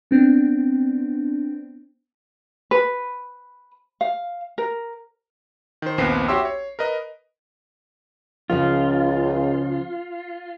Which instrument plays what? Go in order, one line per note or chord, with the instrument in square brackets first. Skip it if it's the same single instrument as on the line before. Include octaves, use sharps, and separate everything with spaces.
[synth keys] B3 C4 D4
[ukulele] B4
F5
A#4
[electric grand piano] D#3 C5
A#1 D#2 B3 C4 C7
F#4 G4 C#5 E5 C6 E6
C#5
A#4 B4 D#5
[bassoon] C#2 [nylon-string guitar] C#3 F3 [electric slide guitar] F4